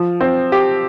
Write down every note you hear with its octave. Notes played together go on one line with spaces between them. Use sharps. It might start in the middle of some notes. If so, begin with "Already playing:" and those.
Already playing: F3
C4
G4